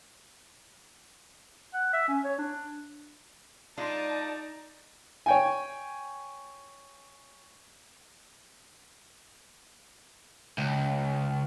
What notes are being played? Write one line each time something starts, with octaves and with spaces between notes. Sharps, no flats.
F#5
E5
C#4
C#5
D4
G#3 D4 D#4 F4 D5 A5
C#5 G5 G#5
C#2